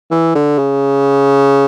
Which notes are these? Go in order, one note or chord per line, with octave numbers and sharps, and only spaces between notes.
E3
D3
C#3